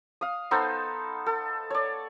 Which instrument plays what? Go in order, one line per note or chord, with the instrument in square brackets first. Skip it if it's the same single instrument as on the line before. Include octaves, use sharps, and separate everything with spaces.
[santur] F5 D#6
B3 D#4 A4 C5
A4
C#5 D5